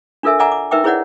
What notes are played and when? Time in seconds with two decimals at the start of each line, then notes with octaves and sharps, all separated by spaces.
0.23 D4 F4 A4 A#4 E5 G#5
0.39 D5 E5 F#5 G#5 A#5 D6
0.52 D6
0.71 D#4 A#4 B4 E5 G5 D6
0.84 E4 G#4 B4 C#5 D5 F#5